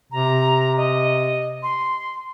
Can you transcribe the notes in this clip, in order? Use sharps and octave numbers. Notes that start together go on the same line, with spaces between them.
C3 A#5
D#5
C6